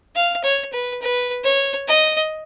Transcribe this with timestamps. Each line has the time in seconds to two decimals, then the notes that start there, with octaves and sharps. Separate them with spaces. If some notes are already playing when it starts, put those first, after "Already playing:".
0.16 F5
0.44 C#5
0.73 B4
1.01 B4
1.44 C#5
1.88 D#5